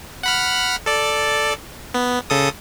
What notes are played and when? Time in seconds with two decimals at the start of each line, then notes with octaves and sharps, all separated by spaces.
0.23 F#5 B5 F6
0.86 A4 D5
1.94 B3
2.30 C#3 A4 D#6